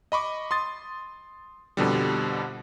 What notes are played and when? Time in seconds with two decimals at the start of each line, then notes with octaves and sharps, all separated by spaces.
0.12 D#5 B5 C#6 D6
0.51 C6 D#6 A6
1.77 F2 B2 D3 G3